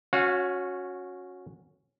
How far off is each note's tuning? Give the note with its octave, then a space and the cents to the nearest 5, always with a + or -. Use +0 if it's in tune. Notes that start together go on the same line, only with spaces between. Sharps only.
C#4 +0 F#4 -20 F5 +40